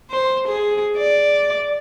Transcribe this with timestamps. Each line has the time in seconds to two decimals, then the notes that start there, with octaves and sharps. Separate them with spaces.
0.10 C5
0.48 G#4
0.97 D5